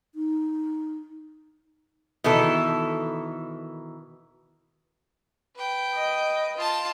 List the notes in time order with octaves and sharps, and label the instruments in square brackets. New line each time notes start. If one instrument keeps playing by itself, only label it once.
[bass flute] D#4
[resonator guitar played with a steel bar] B2 D#3 E3 A4
[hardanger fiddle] B4 G5
[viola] D#5
[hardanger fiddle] F4 A5